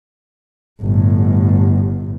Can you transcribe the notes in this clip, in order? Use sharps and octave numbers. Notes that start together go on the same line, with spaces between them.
G1 A2